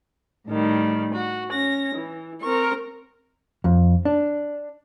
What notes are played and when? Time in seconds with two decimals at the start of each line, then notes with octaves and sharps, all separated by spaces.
0.48 A2 D#3 G3
1.12 F#4
1.50 C#4 A#6
1.95 E3
2.41 C4 A#4 C#6
3.64 F2
4.05 D4